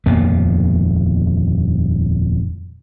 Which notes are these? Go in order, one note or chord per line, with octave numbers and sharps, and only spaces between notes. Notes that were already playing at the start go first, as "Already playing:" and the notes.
D#1 F2 A#3 B3